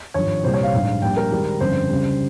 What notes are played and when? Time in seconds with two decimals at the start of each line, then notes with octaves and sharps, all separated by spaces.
0.14 G#1 G2 F3 C#5
0.43 C2 A#2 G3 C5
0.54 C#5
0.63 F5
0.73 A#1 G#2 G3
1.02 A#1 A#2 G3 G5
1.17 A#4
1.31 G#1 G#2 D#3 G3
1.60 G1 F2 C#3 G3 C5
1.89 C#2 C#3 G3